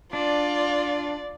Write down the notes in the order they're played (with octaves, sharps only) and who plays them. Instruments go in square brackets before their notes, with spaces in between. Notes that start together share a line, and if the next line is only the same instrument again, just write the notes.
[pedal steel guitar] D4 [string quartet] F4 [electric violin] D5